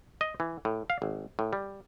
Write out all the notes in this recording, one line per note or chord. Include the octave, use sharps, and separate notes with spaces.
D#5
E3
A2
F5
G#1
A2
G3